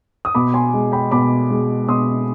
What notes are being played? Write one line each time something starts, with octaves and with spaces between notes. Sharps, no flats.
D#6
B2 B5 D6
G#5 C6
G#3
G5 B5
B2 B5 D6
G#3
B2 C6 D#6